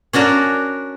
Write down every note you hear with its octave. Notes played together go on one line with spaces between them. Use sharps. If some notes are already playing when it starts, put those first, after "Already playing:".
C#4 D4 F#4 A#4